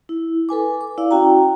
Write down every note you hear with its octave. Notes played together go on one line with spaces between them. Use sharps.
E4
A4 B4 G#5 D6
D6
E4 D5 F5
C#4 F#4 G5 A#5